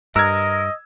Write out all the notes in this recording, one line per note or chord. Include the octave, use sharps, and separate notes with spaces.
G2 A#4 D#5 E6 G#6